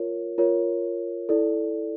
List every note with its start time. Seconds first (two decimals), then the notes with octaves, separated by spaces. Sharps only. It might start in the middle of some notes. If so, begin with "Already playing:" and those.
Already playing: F4 A#4 C#5
0.38 F4 A#4 C#5
1.29 E4 A4 D5